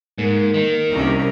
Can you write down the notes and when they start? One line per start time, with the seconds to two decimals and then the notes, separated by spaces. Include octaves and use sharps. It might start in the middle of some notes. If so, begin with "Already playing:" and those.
0.18 G#2 A#3
0.54 D#3
0.92 C2 C3 C#4 A#4